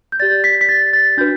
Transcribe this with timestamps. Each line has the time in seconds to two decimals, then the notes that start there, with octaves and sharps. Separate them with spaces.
0.12 G6
0.20 G4 D5 A6
0.44 B6
0.61 B6
0.69 A6
0.93 A6
1.17 D4 F#4 B4 G6